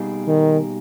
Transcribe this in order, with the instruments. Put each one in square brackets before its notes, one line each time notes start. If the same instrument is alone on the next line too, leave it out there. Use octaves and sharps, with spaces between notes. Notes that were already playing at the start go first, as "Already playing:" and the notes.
Already playing: [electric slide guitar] B2 G3 A#3 D#4 G#4
[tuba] D#3